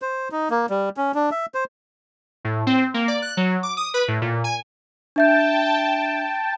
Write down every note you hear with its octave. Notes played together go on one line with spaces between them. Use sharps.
C5
D#4
A#3
G3
C#4
D4
E5
C5
A2
C4
A#3
D5
F#6
F#3
D6
D#6
B4
A2
A#2
G#5
D4 E5 G5 A5 G6